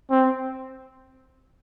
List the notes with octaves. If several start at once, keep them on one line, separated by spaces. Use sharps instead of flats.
C4